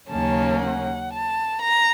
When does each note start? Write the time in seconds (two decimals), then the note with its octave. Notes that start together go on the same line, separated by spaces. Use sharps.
0.10 D#2 C#3 F#3 A#3 C#4 A5
0.62 F#5
1.12 A5
1.62 A#5